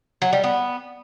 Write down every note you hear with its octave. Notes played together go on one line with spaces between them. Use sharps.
F#3
G3
B3